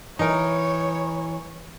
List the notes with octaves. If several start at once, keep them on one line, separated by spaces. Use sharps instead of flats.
E3 D#4 A#4 C#5